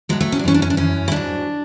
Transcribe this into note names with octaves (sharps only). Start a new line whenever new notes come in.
A2 F#3 G#3
A3
C#4
D4
F#2 E3 C#4
D4
C#4
D4
F#2 E3 C#4
E4
G#2 F#3 D4